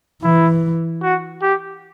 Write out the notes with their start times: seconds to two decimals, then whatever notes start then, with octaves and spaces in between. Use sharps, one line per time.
0.23 E3 E4
1.03 F#4
1.42 G4